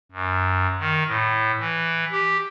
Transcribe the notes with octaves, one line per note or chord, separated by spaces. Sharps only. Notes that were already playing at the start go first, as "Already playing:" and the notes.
F#2
D#3
A2
E3
G4